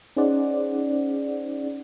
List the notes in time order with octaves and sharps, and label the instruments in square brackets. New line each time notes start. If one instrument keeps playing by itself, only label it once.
[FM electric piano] C#4 D#4 G#4 C5 D5 F#5